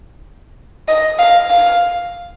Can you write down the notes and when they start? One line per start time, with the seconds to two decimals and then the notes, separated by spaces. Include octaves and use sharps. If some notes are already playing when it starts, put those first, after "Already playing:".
0.88 D#5
1.19 F5
1.50 F5